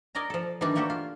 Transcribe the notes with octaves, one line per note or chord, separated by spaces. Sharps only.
A#4 D5 D#5 G#5 A#5
F3 A4
D#3 E3 G3 D4
A3 A#3 F#4 G4 A4
F4